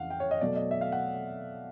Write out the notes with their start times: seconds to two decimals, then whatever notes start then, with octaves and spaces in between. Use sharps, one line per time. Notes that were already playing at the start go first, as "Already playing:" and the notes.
Already playing: F2 C#3 E3 F5 F#5
0.10 G5
0.20 C#5
0.31 D#5
0.41 B2 F#3 A3 D5
0.56 D#5
0.71 E5
0.81 F5
0.92 F#5